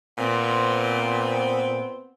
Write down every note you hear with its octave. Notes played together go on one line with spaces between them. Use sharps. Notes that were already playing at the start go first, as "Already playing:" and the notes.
A#2 B3 C4